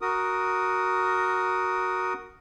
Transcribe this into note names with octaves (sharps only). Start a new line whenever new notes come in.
F#4 A#4 D#6